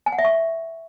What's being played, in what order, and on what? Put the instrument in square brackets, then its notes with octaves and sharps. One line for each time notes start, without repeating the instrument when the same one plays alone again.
[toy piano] G#5
F#5
E5
C#6